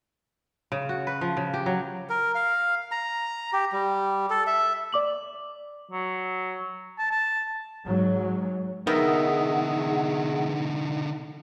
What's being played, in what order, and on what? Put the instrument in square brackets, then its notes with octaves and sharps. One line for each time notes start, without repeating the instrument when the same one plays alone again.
[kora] C#3
F#4
B4
F3
C#3
G4
F#3
[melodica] A#4
F5
A#5
G4
G3
A4
E5
[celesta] D5 D6 F#7
[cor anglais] F#3
[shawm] A5
A5
[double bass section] G#2 F#3
[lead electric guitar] D3 D#4 [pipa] D#3 [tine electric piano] B3 D#5 E5 [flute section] G#4 F#5